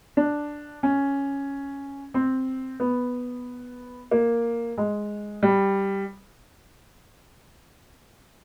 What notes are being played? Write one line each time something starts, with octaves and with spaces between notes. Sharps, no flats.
D4
C#4
C4
B3
A#3
G#3
G3